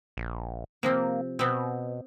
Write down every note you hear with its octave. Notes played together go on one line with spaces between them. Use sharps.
A#1
C3 F3 A#3 C4
B2 B3 C4